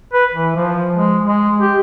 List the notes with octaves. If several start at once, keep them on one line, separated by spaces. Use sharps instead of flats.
B4
E3
F3
G#3
G#3
G4